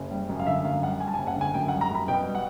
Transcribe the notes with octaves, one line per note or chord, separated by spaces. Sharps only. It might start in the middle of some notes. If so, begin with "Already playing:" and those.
Already playing: F#1
G3
F#2
F5
D3 E5
F#2 F5
G3 F#5
G3 G#5
A5
G#5
F#1
F#5
D3 G#5
F#2 G5
F#5
G3
A#5
F#2 B5
B2 G5
G3
F#5